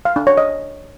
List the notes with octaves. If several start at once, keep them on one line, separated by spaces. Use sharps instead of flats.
F5
D4
C#5
D#5